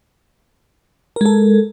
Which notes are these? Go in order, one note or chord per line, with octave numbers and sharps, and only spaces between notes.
G#3 A4 A#4